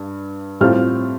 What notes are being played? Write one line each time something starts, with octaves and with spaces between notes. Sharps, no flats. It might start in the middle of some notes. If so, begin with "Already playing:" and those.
Already playing: G2
A2 G3 C4 F4 F6